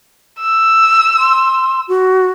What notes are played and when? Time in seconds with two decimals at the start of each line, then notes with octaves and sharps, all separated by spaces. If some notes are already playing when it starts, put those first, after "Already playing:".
0.41 E6
1.18 C6
1.88 F#4